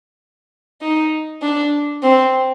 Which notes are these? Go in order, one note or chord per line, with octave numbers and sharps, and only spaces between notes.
D#4
D4
C4